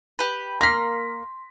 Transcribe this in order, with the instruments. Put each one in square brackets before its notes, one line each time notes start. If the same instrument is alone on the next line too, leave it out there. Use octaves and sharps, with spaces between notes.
[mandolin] G4 B4
[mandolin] A#3 F6 [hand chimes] C6 [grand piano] A#6 B6